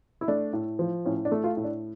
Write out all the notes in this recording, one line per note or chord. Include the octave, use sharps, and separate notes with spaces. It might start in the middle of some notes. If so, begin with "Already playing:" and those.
E4
A3 D4
A2
F3
A2 C#4
D4
A3
F4
A2
D4